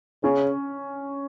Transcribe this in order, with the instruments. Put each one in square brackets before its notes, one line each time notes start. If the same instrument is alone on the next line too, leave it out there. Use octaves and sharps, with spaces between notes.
[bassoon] C#3 [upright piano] C#4